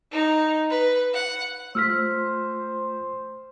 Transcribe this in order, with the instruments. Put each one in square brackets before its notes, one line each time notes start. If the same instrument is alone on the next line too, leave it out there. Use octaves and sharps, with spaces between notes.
[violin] D#4
B4
F#5
[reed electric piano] A3 F4 [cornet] C5 [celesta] E6 F6 B6